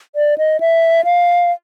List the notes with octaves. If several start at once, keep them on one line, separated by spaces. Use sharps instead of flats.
D5
D#5
E5
F5